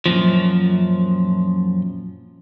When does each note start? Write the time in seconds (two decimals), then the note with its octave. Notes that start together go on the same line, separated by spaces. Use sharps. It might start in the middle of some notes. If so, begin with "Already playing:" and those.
0.06 F#2 A#2 F3